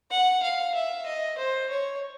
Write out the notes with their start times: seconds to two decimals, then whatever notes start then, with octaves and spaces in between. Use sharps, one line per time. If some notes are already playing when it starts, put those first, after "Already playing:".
0.11 F#5
0.42 F5
0.74 E5
1.06 D#5
1.38 C5
1.70 C#5